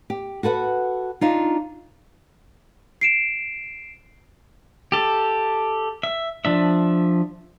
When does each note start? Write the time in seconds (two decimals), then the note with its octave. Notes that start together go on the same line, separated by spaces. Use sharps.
0.10 G4
0.43 F#4 A4 B4 F#5
1.21 D4 D#4 F4
3.01 C7 D7 E7
4.92 G4 A4
6.03 E5
6.45 F3 D4 E5